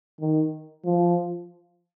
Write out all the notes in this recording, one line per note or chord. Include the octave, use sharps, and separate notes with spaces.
D#3
F3